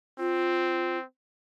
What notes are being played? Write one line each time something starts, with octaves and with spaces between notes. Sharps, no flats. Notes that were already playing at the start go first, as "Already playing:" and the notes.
C4 F4